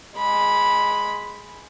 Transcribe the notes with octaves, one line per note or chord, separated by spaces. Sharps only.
G#3 B5